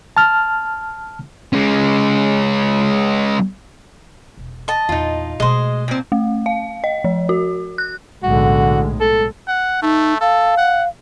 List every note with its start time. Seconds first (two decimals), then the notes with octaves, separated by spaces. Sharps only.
0.17 A5 F6
1.53 G#3 C#4
4.37 E1
4.68 D#5 A5
4.89 A#1 E2 D#4 F4
5.40 B2 G#3 A3 C5 D#5
5.88 A#2 C4
6.12 A3
6.46 F5
6.84 D#5
7.04 F3
7.29 F#4
7.78 F#6
8.23 B1 A2 D3 G#3 F#4
9.01 A4
9.48 F#5
9.82 A3 D#4
10.21 A4 F5
10.57 F#5